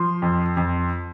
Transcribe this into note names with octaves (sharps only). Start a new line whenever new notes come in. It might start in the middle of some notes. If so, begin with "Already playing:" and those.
Already playing: F3 C6
F2
F2